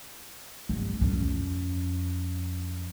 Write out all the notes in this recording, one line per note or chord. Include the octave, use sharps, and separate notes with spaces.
G1
F2 C#4